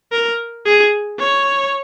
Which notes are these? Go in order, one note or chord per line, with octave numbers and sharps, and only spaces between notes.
A#4
G#4
C#5